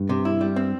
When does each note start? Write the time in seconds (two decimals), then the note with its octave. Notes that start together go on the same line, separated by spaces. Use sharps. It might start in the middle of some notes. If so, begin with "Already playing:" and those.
Already playing: G2
0.09 C3
0.25 E4
0.41 G3
0.56 C4